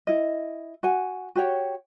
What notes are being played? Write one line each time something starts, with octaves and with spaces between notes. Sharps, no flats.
E4 D#5
F#4 F#5 G#5
F#4 G4 C#5 G5